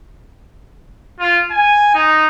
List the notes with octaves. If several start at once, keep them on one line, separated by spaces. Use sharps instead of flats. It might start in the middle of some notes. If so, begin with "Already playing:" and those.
F4
G#5
D#4